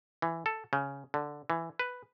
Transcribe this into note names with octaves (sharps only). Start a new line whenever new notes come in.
E3
A4
C#3
D3
E3
B4